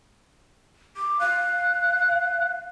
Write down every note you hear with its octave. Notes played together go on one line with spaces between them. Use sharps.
D6
F5 F#6